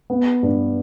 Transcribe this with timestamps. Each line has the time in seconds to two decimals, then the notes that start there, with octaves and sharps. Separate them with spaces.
0.10 B3
0.43 G2